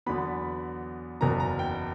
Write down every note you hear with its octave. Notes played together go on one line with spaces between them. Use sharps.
E2 D3 F#3 B3 B5
F#1 E2 B2 A#5
A#5
G5